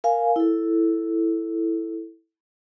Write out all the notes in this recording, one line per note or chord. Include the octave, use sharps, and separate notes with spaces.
A#4 F5 G#5
E4 A4